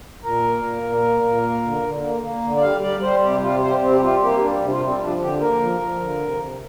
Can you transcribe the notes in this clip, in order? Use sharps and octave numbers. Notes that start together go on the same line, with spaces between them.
A#2 A#4
A#3
A#2
A#2
A#3
A#2
A#3
D3
D3
A#3
A#3
D3
D5
G3 F5
G3 D5
G3 C5
C3 G4
G3 F4
G3 C5
C3 C4
G4
G3 F4
A#3 G4
G3 D4
C3
D4
F4
G3
C4
F3 D4
D3 G4
A#3 A#4
F3
F3
D3
C3
C3